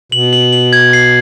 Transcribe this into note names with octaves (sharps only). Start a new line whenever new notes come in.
B2 F#7
F#7
F#7
G#6
C7